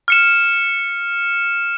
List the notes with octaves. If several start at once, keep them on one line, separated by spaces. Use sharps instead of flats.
F6 C#7 E7